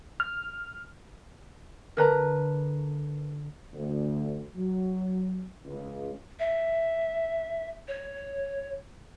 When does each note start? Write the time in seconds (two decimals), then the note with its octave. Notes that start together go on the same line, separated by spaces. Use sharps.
0.20 F6
1.97 D3 A#4 B4 A#5
3.73 D2
4.56 F#3
5.66 C#2
6.39 E5
7.88 C#5